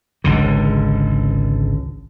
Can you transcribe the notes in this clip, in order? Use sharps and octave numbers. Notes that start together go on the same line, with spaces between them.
G#1 C#2 D3